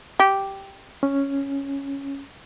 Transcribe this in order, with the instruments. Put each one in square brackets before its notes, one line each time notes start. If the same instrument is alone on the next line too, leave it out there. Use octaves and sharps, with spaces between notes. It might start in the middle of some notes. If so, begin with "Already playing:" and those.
[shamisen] G4
[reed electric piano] C#4